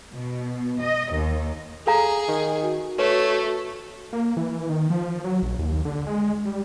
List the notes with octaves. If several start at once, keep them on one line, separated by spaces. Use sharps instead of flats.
B2
D#5
D#2
G#4 A4 F5 A#5
D#3
F#4
A3 B4 C#5
A#3
E3
D#3
F3
F#3
A#1
D#2
D3
G#3
G3